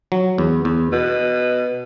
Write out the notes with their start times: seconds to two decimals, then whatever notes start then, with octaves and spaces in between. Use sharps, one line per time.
0.12 F#3
0.38 E2
0.65 E2
0.93 B2